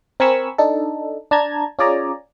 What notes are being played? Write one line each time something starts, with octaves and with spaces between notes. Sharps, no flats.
C4 A#4 G#5 B5 C#6 E6
D4 D#4 A4
D4 A5 A#5 G#6
C#4 F4 G#4 D5 G#5 A#5